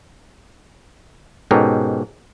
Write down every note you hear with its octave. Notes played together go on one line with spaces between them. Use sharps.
G#2 B2 C#4 G4 A4 A#4